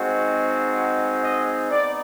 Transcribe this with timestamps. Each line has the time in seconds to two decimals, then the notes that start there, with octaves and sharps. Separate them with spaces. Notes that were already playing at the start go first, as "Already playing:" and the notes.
Already playing: G#3 C4 D#4 F#4
1.21 D#5
1.70 B3 D#4 D5